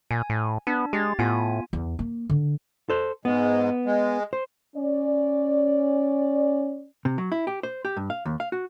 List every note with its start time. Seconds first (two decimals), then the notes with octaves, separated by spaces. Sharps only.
0.11 A#2 G#5
0.30 A2
0.67 B3 D4
0.93 G#3 G4 A6
1.19 A2 B3 F4 G#5
1.73 E2
1.99 A#3
2.30 D3
2.90 A4 C5
3.25 G#2 G#3 B3
3.86 G#3
4.33 C5
4.75 C#4 D5
7.05 C3
7.18 F#3
7.32 E4
7.47 G4
7.63 C5
7.85 G4
7.97 G2
8.10 F5
8.25 D#2
8.40 F5
8.52 F#4